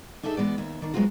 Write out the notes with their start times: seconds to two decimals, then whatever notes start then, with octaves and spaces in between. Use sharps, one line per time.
0.23 D4 D#4 G#4 A4 E5
0.37 E3 G#3 B3 D5
0.58 D#2 E5
0.82 D#3 D4
0.94 F#3 G#3 B3 C4 F4 F#4